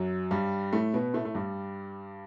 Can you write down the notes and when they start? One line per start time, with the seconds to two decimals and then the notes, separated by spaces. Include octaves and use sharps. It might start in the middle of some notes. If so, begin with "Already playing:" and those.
Already playing: F#2 F#3
0.31 G2 G3
0.73 A2 A3
0.94 B2 B3
1.14 A2 A3
1.25 A3
1.35 G2 G3